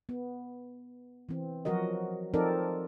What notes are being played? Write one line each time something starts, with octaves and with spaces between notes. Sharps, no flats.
B3
E3 C4
F3 F#3 F#4 A#4 D#5
F3 C4 D#4 A4 A#4 D5